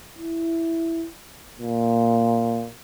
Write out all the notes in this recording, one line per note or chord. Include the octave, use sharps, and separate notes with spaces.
E4
A#2